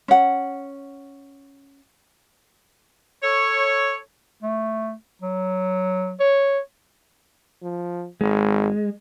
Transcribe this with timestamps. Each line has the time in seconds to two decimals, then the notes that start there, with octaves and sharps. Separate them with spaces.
0.08 C#4 F#5
3.22 A4 C#5
4.43 A3
5.22 F#3
6.20 C#5
7.63 F3
8.21 G#1 G#3